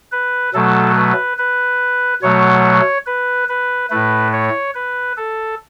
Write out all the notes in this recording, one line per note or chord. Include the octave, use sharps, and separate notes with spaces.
B4
B2 F#3 A3 A4
B4
B4
B2 F#3 A3 C#5
B4
B4
A2 A3 B4
C#5
B4
A4